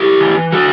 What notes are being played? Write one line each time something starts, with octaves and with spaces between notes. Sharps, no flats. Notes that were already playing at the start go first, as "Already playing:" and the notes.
Already playing: E4 G4
E3
A2 F#4 A4